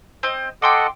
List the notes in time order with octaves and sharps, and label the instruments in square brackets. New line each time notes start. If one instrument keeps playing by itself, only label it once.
[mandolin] C4 D#5
[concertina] A4 D#5 F#5 [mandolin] G5 C6 D6